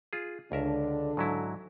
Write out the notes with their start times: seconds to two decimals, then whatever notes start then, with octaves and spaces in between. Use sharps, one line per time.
0.13 F4 G#4
0.52 C#2 D3 D4 A#4 E5
1.17 G#2 F#3 E4